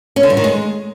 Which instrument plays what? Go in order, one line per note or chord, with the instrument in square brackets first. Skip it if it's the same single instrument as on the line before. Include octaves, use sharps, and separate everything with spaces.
[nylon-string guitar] C#4
D3
G2
D#3
G#3